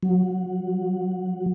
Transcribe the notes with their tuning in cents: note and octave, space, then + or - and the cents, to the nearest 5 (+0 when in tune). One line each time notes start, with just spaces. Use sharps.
F#3 -15